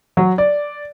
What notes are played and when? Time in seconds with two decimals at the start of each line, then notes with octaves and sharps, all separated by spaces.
0.17 F#3
0.38 D5